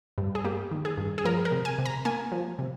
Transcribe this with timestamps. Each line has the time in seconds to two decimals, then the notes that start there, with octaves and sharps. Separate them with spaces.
0.18 G2
0.35 G#4
0.44 A#3 G4
0.71 D#3
0.85 G#4
0.98 G2
1.18 G#4
1.25 F3 A#4
1.45 A#4
1.52 C3
1.65 G#5
1.78 C3
1.86 A#5
2.05 A#3 G#5
2.32 F3
2.59 C3